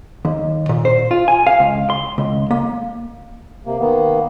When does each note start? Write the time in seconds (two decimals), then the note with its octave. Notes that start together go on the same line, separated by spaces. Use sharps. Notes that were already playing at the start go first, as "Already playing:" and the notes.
0.25 D#2
0.69 A#2
0.85 C5
1.11 F4
1.28 G#5
1.47 F5
1.60 C#2
1.90 C6
2.18 C#2
2.51 A#3
3.66 C3 A#3
3.79 D#3 A#3 B3